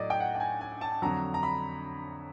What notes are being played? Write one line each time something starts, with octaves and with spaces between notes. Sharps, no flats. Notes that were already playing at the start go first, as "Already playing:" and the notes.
Already playing: A2 F#3 D5 D#5
G5
F#5
G5
G#5
G#5
A5
F2 D3 F#3 A#5
A#5
B5